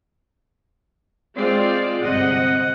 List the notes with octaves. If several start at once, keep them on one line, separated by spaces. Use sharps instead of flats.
G#3 C4 F4 D5
G1 C3 D#5 F#5